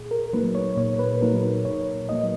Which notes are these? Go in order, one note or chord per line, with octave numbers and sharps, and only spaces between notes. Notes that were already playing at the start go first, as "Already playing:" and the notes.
Already playing: A#2 G#4
A#4
F#3 A#3 D#4 B4
C#5
A#2 C#5
B4
F#3 A#3 D#4 A#4
B4
A#2 C#5
F#3 A#3 D#4 D#5